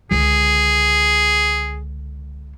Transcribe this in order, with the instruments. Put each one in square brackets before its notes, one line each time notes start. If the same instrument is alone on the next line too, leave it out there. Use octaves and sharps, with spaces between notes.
[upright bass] C#2 D3 [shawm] G#4